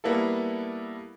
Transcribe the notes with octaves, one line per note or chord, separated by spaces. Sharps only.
G3 A#3 B3 E4 A4